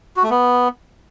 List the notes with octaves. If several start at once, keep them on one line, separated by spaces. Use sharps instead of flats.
F#4
A3
B3